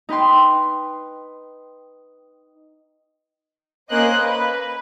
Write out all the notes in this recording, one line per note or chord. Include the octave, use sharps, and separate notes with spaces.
D#4 B4 G5 C6
A#3 C#4 C5 D#5 F#6
B4